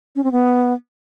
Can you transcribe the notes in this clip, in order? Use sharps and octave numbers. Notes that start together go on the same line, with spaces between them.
C#4
C4
B3